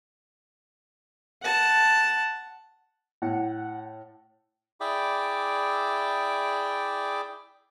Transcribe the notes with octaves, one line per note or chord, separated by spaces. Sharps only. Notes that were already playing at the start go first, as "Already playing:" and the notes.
F#5 A5
A2 F#5
E4 G#4 D5 E5 G5 D6